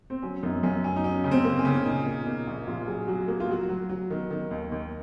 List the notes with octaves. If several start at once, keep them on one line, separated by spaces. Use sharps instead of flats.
C4
F#3 C#4
F#2 D#4
F#2 C#4
F#3 C#4
D#4
F#3 C#4
C#3
C4
A#3
C#4
C#3
A#2 D#4
A#2
A#2 D#4
A#1
A#1 F4
F#3 G#4
F#3 F#4
A#3 F#4
F4
F#3 F#4
F#3
F#3
D#3
D#3
D#2
D#2